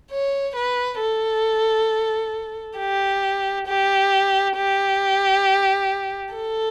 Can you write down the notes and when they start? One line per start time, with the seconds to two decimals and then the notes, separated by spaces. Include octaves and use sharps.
0.11 C#5
0.56 B4
1.00 A4
2.78 G4
3.67 G4
4.57 G4
6.34 A4